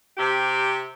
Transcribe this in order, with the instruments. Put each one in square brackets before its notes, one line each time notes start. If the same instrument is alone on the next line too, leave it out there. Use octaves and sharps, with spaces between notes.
[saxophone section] C3 G4